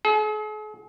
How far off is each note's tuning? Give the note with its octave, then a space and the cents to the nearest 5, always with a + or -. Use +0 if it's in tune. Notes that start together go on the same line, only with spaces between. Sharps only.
G#4 +45